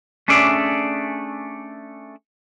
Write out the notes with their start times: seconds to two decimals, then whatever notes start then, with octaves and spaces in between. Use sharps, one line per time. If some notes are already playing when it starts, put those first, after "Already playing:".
0.28 A3 C#4 D4 G#4 D5 E5